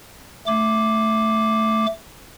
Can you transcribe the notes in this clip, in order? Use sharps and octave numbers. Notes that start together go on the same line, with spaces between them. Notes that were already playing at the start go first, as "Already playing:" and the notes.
A3 D6